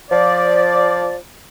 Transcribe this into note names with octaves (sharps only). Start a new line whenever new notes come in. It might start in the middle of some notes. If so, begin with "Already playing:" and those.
F3 D5